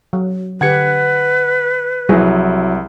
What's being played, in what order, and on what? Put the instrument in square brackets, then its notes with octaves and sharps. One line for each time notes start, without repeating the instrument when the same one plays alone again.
[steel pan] F#3
[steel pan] D3 G4 [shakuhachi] B4 [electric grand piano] F#5 G#6 C#7
[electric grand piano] C2 [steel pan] F3 G#4 [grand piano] F#3 E4